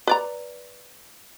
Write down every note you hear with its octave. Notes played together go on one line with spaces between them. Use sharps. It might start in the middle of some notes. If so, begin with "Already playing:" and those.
B4 D5 A#5